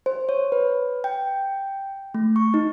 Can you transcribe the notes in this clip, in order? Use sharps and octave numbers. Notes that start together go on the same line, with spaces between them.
C5
C#5
B4
G5
A3
C#6
D#4